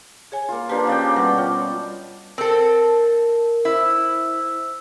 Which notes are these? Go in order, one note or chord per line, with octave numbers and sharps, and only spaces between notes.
G#4 C#5 G#5
A#3 F4
F3 A#3 D4 G4 B4
C#3 D5 F5 G5
B2 G3 B4 F#5
F4 C#5 G5
C4 A4 A#4
E4 C5 E6